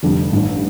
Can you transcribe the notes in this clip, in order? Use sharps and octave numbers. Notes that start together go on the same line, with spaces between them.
F1 F2 D3 G3
A1 G2 D#3